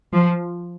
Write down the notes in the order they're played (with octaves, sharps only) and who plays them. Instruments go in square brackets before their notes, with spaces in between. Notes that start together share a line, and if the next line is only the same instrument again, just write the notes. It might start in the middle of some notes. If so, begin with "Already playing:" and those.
[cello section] F3